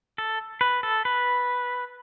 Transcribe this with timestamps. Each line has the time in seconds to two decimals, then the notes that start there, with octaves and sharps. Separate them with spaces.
0.18 A4
0.61 B4
0.83 A4
1.05 B4